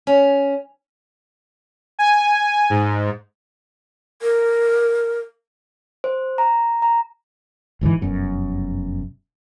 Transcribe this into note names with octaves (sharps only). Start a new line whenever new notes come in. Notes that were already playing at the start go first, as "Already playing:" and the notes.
C#4
G#5
G#2
A#4
C5
A#5
A#5
G1 G#2 D3 E3
F1 F#2 B2